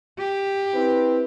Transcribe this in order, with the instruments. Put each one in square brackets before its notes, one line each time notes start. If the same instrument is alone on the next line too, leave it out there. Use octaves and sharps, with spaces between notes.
[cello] G4
[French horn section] C4 E4 B4